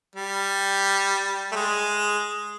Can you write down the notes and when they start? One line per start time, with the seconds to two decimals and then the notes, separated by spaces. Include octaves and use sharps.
0.15 G3
1.52 A3
1.55 G#3